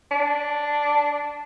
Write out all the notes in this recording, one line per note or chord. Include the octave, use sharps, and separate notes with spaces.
D4